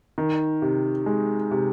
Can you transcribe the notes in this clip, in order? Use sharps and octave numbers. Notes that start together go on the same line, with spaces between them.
D#3
C3
G#3
C3